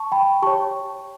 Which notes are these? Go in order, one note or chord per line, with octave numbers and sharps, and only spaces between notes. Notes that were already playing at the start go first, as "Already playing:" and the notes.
Already playing: A5 C#6
G5 B5
G4 C#5 A5 C#6